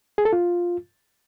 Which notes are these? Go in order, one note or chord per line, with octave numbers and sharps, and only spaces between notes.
G#4
A4
F4